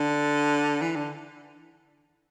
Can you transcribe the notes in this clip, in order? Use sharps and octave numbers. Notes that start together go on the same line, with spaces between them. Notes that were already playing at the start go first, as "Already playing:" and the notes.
Already playing: D3
E3
D3